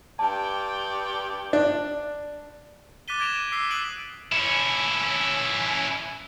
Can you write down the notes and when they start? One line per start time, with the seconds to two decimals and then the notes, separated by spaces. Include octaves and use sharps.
0.19 G2 D5 G5 A5
1.53 D4
3.08 D6 F#6 A6 B6 D#7 G7
3.20 G#6 A#6 D7 E7 F7 G7
3.52 D6 E6 B6 C7 G7
3.70 D#6 F#6 D7 F#7
4.32 C#4 E4